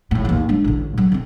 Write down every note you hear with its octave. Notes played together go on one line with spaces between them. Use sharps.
G#1 A2
A1 D#2
G#3 D4
A1 D3
F#3
D3 C4